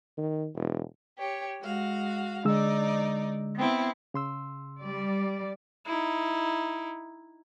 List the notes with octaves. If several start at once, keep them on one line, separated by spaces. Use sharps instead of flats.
D#3
E1
G4 C#5
G#3 F#4 F5
D3 G#3 D#4 D5 E6
B3 C4 E4
C#3 C6 E6
G3 D5
D#4 E4